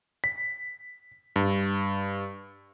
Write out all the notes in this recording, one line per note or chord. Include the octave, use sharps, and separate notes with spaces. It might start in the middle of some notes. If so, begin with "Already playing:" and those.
B6
G2